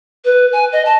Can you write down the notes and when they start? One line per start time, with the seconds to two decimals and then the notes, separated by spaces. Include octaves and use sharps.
0.25 B4
0.53 G#5
0.72 D#5
0.85 A5